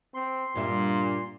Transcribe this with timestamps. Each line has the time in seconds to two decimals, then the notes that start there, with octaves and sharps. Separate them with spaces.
0.14 C4 C6
0.56 G2 A#2 G3 E5